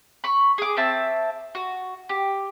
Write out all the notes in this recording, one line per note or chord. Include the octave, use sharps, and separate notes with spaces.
B5 C#6
G#4 D6
C4 E5 A5 E6
F#4
G4